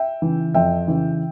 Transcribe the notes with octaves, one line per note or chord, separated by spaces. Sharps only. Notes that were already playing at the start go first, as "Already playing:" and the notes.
Already playing: E5 G5
C#3 E3
F2 E5 G5
C#3 E3